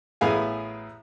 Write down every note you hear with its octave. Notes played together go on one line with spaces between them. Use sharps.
A1 A2 B3 G#4 F5 G#5